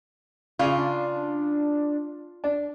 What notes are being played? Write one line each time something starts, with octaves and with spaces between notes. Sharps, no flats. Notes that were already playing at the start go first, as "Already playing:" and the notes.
C#3 F4 D5
D4
D4